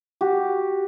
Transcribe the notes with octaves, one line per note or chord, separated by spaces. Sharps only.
F#4 G4